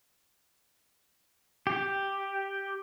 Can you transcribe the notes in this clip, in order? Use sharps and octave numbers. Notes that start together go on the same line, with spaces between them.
G4